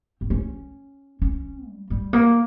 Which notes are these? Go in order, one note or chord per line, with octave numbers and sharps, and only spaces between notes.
C4
C#4
C#4
G3
G3
A#3